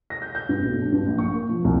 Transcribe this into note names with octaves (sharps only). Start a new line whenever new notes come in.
A#6
G6
G6
G2
B1
D4
G2
A#1
C#6
A#3
F3
C2